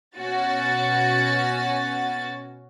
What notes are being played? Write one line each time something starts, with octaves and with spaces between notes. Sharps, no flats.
B2 C#4 F#4 A6